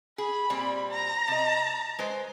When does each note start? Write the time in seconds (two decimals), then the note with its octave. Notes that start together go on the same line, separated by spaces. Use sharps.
0.18 G#4 B5
0.50 A#2 G3 C4
0.91 A#5
1.28 C3 D#5
1.99 G#3 B4 C5